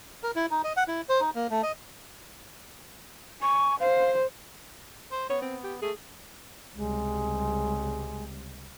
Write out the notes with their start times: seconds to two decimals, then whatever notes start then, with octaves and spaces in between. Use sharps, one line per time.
0.24 A#4
0.36 E4
0.51 D#4
0.64 D#5
0.77 F#5
0.88 E4
1.09 C5
1.21 D#4
1.35 A#3
1.51 A3
1.63 D#5
3.42 G#5 C#6
3.80 C5 F5
5.12 C5
5.30 B3 C#5
5.42 C4
5.64 G4
5.82 A3 G#4
6.75 C#2 C3 G3 G#3